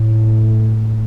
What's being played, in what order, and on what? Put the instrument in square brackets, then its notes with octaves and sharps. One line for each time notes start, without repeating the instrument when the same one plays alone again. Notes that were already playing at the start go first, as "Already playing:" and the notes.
Already playing: [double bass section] A2